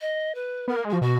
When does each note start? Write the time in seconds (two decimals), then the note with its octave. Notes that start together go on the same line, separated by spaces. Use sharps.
0.01 D#5
0.35 B4
0.68 B3 A#4
0.76 A#3
0.85 G#3
0.90 F#4
0.93 F3
1.01 B2 F#4